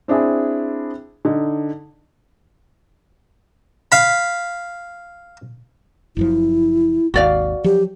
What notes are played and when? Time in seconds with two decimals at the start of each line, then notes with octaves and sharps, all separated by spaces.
0.08 C4 D4 E4 G#4
1.25 D3 D#4
3.92 F5 B5
6.17 F#1 F#2 F3 E4
7.14 G#1 D#2 F#4 D5 F5
7.64 F3 F#3 G4